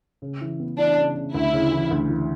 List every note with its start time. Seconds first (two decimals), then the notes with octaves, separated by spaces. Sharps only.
0.22 C#3
0.41 E3
0.60 B3
0.78 E3 D4
0.97 C#3
1.15 C#3
1.34 D2 E4
1.53 C#3
1.71 E3
1.91 D2
2.10 E3